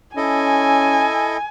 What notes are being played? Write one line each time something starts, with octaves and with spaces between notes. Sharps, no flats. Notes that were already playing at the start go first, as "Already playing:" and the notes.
C#4 E4 A4 D#5 G#5